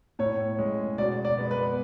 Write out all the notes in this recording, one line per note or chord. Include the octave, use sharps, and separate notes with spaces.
A2 C#5
G#3 C#4
B2 D5
D5
G#3 B3
B4